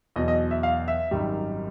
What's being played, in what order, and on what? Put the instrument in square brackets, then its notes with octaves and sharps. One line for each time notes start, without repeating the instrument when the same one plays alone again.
[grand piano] E2 B2 F#3 D#5
D#5
E5
F5
E5
G#1 F#2 D#3 G3